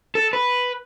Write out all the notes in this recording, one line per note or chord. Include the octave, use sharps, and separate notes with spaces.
A4
B4